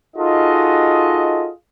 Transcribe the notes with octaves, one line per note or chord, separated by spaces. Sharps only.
D#4 F4 F#4 G#4 A4 D#5